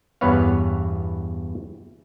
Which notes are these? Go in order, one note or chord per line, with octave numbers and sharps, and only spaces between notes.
E2 G2 B3 B4 C#5 F5